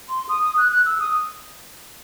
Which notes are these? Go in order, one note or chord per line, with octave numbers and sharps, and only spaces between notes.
C6
D#6
D#6
F#6
F#6
E6
D#6